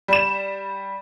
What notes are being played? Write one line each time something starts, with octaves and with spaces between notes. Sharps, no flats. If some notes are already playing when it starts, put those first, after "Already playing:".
G3 E7